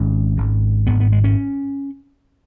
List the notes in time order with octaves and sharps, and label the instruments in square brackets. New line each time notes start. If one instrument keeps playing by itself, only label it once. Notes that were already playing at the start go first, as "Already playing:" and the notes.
Already playing: [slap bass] G#1 G#2 C#4
G#1 G#2
G#1 G#2 B3
B3
G#3
C#4